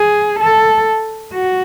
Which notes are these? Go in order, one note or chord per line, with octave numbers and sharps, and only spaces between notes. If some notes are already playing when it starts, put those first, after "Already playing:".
Already playing: G#4
A4
F#4